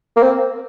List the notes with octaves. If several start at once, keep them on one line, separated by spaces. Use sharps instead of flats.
A#3
C4